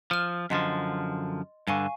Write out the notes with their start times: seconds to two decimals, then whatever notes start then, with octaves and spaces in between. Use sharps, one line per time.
0.11 F3 F6 D#7
0.50 F#2 D3 F3 D#5 C6 A6
1.67 G2 D3 F5 G#5 C#6